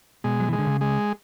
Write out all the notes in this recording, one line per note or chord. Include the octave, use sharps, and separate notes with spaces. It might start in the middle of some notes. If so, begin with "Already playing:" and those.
B2 G#3
F#3
E3 G#3
D3
C#3
G#3